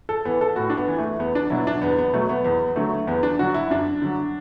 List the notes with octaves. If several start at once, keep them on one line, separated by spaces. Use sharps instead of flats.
A4
E3 B3
A4
A2 F#4
D4
B3
E3
A3
E2 B3
D4
B2 F#3 E4
D4
E2 B3
B3
B2 F#3 A3
B3
E2 B3
D3 F#3 A3
E2 B3
D4
D3 F#3 F#4
E4
F#2 D4
D3 F#3